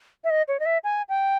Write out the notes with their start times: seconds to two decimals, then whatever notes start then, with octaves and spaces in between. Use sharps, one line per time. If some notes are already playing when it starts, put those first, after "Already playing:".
0.24 E5
0.30 D#5
0.48 C#5
0.60 D#5
0.66 E5
0.84 G#5
1.09 G5